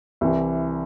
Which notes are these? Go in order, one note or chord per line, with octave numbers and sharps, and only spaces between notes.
C2 C3 E3